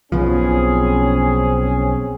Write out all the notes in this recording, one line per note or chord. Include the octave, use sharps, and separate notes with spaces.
B1 B2 F3 C4 C#4 G#4